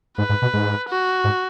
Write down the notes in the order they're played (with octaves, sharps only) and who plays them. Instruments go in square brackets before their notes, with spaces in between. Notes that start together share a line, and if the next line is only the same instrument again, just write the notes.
[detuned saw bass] G#2 [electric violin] B4
[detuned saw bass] G#2
B2
G#2
[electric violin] F#4
[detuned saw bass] G#2